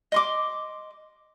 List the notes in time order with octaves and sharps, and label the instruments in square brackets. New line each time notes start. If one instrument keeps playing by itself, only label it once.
[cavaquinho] D#5 C6 D6